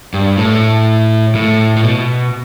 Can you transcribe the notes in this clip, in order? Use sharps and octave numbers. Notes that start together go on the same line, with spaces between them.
G2
A2
A2
A2
B2